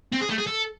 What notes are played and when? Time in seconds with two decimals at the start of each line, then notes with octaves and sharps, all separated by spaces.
0.13 C4
0.21 G#4
0.30 A3
0.38 G#4
0.47 A4